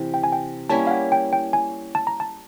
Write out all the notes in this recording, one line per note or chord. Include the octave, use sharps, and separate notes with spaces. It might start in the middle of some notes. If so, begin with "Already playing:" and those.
Already playing: C3 E3
G5
G#5
G5
G3 A#3 C#4 E4 A5
F5
F#5
G5
G5
G#5
A5
A#5
A5